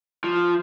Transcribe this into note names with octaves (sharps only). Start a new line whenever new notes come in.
F3